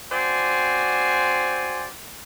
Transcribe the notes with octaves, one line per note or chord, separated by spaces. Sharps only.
C4 F#4 C5 D5 G#5